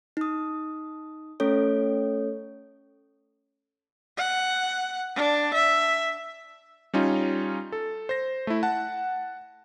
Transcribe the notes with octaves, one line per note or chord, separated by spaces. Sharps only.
D#4 D#6
A3 C#4 A4 C#5
F#5
D4
E5
G3 C#4 D#4 F4
A4
C5 A#6
A3 E4
F#5 A5